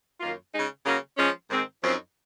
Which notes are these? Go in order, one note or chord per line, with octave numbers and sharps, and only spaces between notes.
F#2 D#3 A#3 F4
C#3 G#3 D#4
C#3 F#3 A#3 C#4
F3 G#3 C#4
G#2 D#3 G#3 C4
F#2 F3 C4 D#4